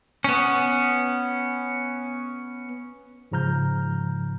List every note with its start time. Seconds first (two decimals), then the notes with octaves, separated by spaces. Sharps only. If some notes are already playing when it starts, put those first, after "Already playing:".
0.24 B3 C#4
3.32 G#2 C#3 F3 A#5 F6 G6